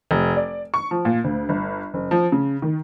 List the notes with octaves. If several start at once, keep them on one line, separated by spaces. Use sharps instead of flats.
F1
D5
C#6
F3
A#2
D2
G1
F#1
F3
C#3
D#3